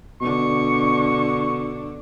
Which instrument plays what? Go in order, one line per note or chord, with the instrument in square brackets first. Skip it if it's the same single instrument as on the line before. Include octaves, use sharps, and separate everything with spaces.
[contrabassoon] B2 [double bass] D3 D4 [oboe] C#6